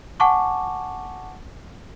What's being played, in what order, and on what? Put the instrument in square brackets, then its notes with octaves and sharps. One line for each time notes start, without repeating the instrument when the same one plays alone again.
[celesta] F#5 G#5 A5 C#6 D6